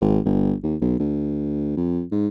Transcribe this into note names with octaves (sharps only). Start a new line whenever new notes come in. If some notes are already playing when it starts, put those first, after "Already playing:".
G#1
G1
D#2
B1
D2
F2
G#2